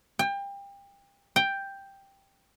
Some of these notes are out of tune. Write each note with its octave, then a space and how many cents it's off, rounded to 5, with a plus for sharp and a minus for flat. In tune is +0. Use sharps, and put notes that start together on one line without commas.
G5 +30
G5 +5